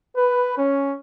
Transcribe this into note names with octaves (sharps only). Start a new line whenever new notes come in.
B4
C#4